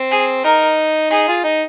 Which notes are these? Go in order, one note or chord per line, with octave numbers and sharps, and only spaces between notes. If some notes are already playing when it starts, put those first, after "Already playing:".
Already playing: C4
G#4
D#4 A#4
D#4 G#4
F4
D#4